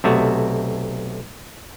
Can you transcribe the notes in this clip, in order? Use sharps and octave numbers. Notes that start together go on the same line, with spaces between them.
B1 C3 A3 F#4